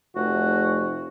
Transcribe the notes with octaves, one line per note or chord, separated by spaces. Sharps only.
F1 F#4